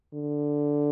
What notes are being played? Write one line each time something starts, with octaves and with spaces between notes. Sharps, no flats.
D3